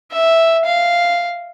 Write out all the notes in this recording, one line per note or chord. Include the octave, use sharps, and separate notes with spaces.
E5
F5